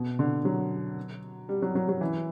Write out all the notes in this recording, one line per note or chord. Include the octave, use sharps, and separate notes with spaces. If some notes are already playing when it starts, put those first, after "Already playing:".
Already playing: B2
D3
F#3
G3
F#3
F#3
F#3
E3